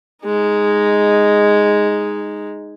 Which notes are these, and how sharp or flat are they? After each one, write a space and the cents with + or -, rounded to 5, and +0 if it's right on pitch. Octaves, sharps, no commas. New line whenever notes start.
G#3 -5 D#4 +0